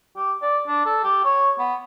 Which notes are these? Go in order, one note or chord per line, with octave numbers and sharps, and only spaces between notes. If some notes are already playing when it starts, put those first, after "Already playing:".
G4
D5
D4
A4
G4
C#5
B3